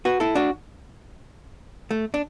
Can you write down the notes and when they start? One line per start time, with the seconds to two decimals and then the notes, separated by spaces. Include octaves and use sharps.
0.05 F#4 B4
0.20 E4 A4
0.35 D4 F#4
1.91 A3
2.14 D4